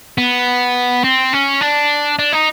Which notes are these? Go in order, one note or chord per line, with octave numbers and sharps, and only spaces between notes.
B3
C4
C#4
D4
D4
D#4